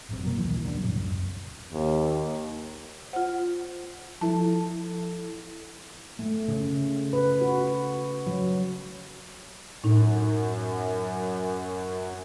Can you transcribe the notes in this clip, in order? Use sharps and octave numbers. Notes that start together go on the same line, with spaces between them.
G1 F#2 C3
B2 F#3 A#3
D#1 B1 D#3 E3
D#1 C#3 F#3 D4
A#1 F2 A2 F#3
C2 F#2
D#2
F4 C5 F#5
F3 E4 A4 A5
A3
C#3
B4
F#4
F#3
F#2 A2 D#4